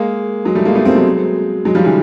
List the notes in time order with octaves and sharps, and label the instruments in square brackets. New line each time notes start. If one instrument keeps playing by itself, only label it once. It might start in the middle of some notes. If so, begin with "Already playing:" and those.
Already playing: [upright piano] G#3 A#3
F#3 G#3
G3 A3
G#3 A#3
A3 B3
A#3 C4
F#3 G#3
F#3 G#3
F3 G3
D3 E3